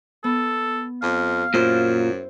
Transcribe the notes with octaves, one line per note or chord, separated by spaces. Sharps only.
B3 A4
F2 F5
F#2 A#2 E4 C5